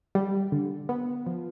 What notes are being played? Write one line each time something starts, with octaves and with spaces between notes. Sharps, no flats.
G3
D3
B3
F3